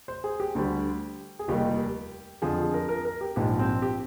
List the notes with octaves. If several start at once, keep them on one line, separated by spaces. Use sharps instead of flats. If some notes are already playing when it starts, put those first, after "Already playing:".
C5
G#4
G4
D2 D3 G3
G#4
F1 D#2 D#3 G3 G4
F2 D3 F3 G#4
G#4
A#4
A#4
A#4
G4
A#1 G#2 F3 G4
C4
G4